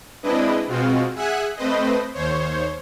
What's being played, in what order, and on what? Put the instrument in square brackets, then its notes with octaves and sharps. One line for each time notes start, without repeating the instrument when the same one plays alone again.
[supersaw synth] G#3 C4 D4 E4 B4 D#5
B2 G#3 C4 F4 F#4
G#4 E5 F#5 G#5 F#6
A3 C4 B4 C5 D#5
D#2 C5 C#5